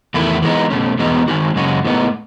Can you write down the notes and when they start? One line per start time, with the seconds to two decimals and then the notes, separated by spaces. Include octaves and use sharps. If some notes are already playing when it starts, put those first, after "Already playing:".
0.14 E2 D#3 A3 E4
0.42 E3 G#3 B3 D#4
0.70 B2 A3 C#4
0.99 E2 B2 G#3 B3 D#4
1.28 D#3 G#3 D#4 F#4
1.56 F#2 C#3 G#3 C#4 F#4
1.85 A2 G#3 B3 D#4